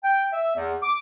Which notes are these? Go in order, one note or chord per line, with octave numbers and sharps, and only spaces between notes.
G5
E5
E2
D6